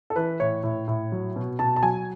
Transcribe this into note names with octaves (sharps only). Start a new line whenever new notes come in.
A4
E3 B4
A2 C#5
A2
A2
F#3
B2
B2 A5
A5
F#3 G#5